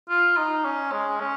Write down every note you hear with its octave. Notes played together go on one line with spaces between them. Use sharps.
F4
D#4
C#4
G#3
C#4